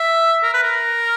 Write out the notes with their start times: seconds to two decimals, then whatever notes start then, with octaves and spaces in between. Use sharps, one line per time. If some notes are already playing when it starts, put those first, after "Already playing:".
Already playing: E5
0.43 A#4
0.54 B4
0.63 A#4